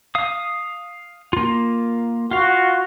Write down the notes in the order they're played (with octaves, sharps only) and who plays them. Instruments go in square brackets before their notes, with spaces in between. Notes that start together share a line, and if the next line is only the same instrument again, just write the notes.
[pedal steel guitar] F5 D#6
A#3 F4
[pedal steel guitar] F4 F5 [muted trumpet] F#4